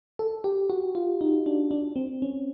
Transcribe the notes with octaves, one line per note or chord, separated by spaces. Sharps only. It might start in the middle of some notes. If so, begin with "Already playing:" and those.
A4
G4
F#4
F4
D#4
D4
D4
C4
C#4